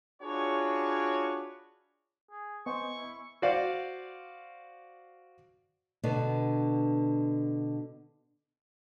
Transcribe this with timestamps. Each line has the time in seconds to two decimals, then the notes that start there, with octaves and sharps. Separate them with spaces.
0.22 D4 F4 F#4 G#4 B4 C#5
2.31 G#4
2.66 B3 C5 D#5 G#5 C#6
2.96 E4
3.42 F#4 C5 D5 F5
6.03 B2 D3 B3 D4